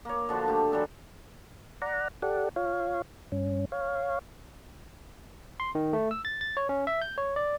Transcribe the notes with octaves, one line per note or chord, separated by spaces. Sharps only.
A#3 C#5
D3 F3 F#4
A3 G4
E3 F#3 D4 A4
D5 F#5 A#5
G4 A4 D5 F#5
F4 C#5 F5
G2 C#4
C#5 F5
C6
D#3
A3
E6
A6
A6
C#5
C#4
E5
G6
C#5
D5